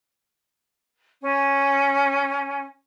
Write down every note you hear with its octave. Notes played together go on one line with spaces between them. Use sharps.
C#4 G#5